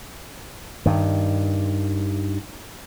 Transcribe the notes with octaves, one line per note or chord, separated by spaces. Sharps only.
G2 D#3